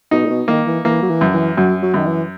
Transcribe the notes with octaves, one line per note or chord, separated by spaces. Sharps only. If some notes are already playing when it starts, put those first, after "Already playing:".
B2 D#4
A#2
B2
D#3 A#3
E3
E3 A#3
F#3
E3
F#2
E3
F#2 F#3
F#3
F#2 D#3
E3